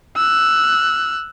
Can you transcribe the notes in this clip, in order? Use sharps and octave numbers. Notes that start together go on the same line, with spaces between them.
E6 F#6